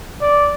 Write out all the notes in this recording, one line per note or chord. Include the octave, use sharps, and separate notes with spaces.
D5